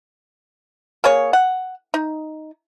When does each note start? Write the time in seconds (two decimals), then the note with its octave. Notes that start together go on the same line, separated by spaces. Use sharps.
1.04 A#3 G#4 C#5
1.33 F#5
1.94 D#4